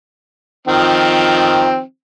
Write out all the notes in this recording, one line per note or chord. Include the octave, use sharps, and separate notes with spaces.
D#3 F3 C4